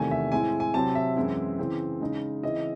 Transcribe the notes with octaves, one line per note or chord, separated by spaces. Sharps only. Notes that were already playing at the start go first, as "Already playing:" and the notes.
Already playing: E2 C3 D#3 A3 G#5
E5
A2 G#3 C4 E4 G#5
G#5
C3 F#3 C4 A5
E5
F#2 E3 G#3 C4 E4
C#3 E3 C4
C#3 G#3 D#4
C#3 E3 C4 E4 D#5